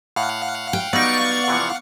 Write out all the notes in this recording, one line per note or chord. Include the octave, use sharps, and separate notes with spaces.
A2 F5 F#5
G5
F#3 G3 B3 D#4 D5 C#6
C3 E3 F3